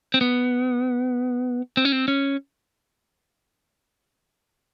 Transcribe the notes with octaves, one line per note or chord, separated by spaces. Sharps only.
C4
B3
C4
C#4
C4
C#4